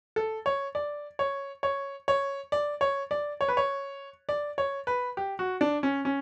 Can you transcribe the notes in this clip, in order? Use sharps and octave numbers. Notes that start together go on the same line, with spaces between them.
A4
C#5
D5
C#5
C#5
C#5
D5
C#5
D5
C#5
B4
C#5
D5
C#5
B4
G4
F#4
D4
C#4
C#4